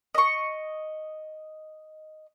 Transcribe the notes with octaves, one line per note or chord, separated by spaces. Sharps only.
D#5 C#6